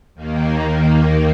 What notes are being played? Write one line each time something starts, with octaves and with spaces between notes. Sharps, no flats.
D#2 D#3 A#3